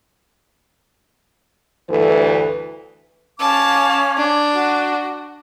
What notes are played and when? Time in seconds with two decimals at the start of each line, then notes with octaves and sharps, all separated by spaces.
1.90 D2 G2 E3 A3 A4 B4
3.40 C#4 F5 A5 D6
4.18 D4
4.54 F#4